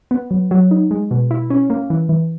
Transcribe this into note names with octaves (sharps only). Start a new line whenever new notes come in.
B3
F#3
F#3
D#4
G#3
B2
E4
C#4
A#3
E3
E3